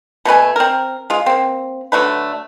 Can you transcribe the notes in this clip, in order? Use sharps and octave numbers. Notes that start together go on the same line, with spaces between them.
B2 A3 B4 G#5
C4 A#4
G#3 F4
A#3 C4
D3 F#3 A3 B4